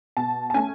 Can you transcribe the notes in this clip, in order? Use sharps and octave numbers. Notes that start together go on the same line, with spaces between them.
B2 A5
A5
A3 C#4 G#5